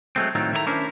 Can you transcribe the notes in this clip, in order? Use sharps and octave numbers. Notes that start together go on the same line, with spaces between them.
F#3 G#3 A3 C4
A2 D#3 F#3 C4 D#4 F4
D#3 A3 E4 C#5 A#5
C#4 D4 E4 A#4 C5